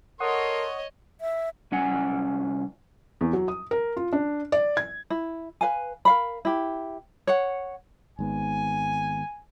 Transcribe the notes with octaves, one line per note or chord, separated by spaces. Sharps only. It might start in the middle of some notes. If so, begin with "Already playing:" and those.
A4 A#4 C#5 D#5 F#5 C6 C#6 D#6
E5
C2 C#4 F#5 G#5
E2
F#3
D#6
A#4
F4
D4
D5
G#6
E4
B4 F5 G#5
A#4 F5 B5
E4 G4
C#5 F#5
G#1 G#2 B3 G#5